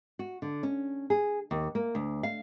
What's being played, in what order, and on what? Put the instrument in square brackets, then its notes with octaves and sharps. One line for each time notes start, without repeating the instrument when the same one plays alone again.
[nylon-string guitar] F#4
D3
C#4
G#4
D#2
A#3
D2
F5